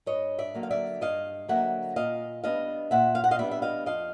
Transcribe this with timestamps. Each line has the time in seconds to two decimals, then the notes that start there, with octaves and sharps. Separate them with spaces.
0.06 G2 C#5 D#5
0.39 D5 E5
0.54 D3 F#3 A#3
0.63 F5
0.71 D5 E5
1.01 G2 D#5 F5
1.48 D3 F#3 A#3 E5 F#5
1.96 A#2 D#5 F5
2.44 G3 B3 D4 D#5 F5
2.91 A#2 E5 F#5
3.15 F5
3.24 F#5
3.31 D#5 F5
3.39 G3 B3 D4 D5 E5
3.51 E5
3.62 D#5 F5
3.86 F2 D#5 F5